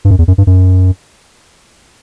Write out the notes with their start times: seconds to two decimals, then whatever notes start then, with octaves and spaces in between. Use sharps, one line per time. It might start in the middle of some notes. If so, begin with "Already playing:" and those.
0.05 G2
0.11 F#2
0.19 E2
0.28 F#2
0.38 G2
0.47 F#2